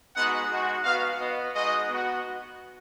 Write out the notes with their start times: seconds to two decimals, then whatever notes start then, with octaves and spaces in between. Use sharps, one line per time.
0.14 G#3 B3 D#4 F#4 F#5
0.50 G#3 D#4 F#4
0.83 B3 F#4 F5
1.19 B3 F#4 D#5
1.54 G#3 D#4 F#4 D#5
1.88 B3 F#4